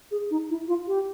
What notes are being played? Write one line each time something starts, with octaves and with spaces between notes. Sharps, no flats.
G#4
D#4
E4
F4
G4